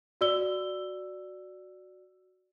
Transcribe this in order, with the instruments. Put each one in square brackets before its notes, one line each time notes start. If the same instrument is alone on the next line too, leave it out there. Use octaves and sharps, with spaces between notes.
[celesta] F#4 D5 E6 G7